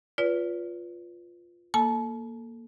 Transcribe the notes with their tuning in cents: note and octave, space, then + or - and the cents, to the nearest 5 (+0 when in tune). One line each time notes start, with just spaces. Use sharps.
F4 +0 B4 +0 D5 -40
A#3 +0 A4 +0 A5 -35